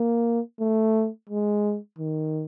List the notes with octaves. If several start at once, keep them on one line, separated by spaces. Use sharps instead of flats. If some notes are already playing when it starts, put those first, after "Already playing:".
Already playing: A#3
A3
G#3
D#3